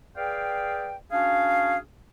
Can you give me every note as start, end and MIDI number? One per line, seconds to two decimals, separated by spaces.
0.16 0.96 68
0.16 0.96 71
0.16 0.96 74
0.16 0.96 77
0.16 0.96 79
1.11 1.77 61
1.11 1.77 62
1.11 1.77 66
1.11 1.77 68
1.11 1.77 77